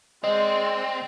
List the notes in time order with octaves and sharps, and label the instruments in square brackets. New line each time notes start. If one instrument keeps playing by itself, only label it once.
[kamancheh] G#3 D5 [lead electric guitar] C4 [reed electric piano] D#5